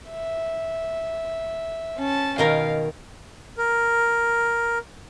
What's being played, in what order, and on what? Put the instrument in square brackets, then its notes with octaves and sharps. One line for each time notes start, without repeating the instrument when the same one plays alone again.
[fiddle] E5
C#4 A5
[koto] B2 D#3 A#4 [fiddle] F5
[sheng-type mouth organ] A#4